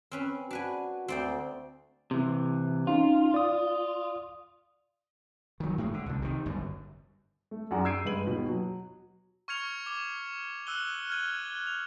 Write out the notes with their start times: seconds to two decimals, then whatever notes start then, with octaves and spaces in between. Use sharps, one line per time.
0.11 C4 C#4 B4
0.51 D4 F#4 B4 G#5
1.08 D2 C4 D5 G5
2.11 C3 E3
2.87 C#4 D#4 F4
3.34 D5 D#6
5.60 D#3 F#3
5.78 A2 G#3
5.94 D3
6.06 C2 A2
6.22 C3 D#3
6.46 G1 F#2
7.51 A3
7.71 F#2 G#4 D5 F#5 A#5
7.85 E6 G6 G#6 C7 D7 D#7
8.05 G2 G#3 B4 D#7 F#7
8.25 D#2 B2
8.49 F#3
9.48 C#6 F6 G#6 C#7 F7
9.86 D6
10.67 E6 F#6 D#7 G7
11.10 F6 G#6 D#7
11.67 F7